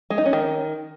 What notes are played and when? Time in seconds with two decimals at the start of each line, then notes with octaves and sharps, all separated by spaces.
0.10 G#3
0.18 D#4
0.25 C#4
0.33 D#3